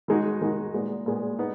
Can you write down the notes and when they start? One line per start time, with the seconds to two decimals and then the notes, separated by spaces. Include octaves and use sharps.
0.08 D#3 G#3 D#4 F#4
0.41 D#3 G#3 D#4 F#4
0.74 A#2 G#3 B3
1.06 A#2 G#3 B3
1.38 B3 D#4